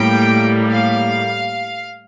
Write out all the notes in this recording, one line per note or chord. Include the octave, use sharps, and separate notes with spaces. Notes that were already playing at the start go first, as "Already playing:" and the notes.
Already playing: A2 G3 A#3 G5
F5